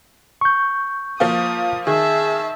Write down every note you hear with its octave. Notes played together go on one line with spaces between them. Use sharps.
C#6 G6
F3 A#3 F4 D#6
D#3 G#4 E5 A5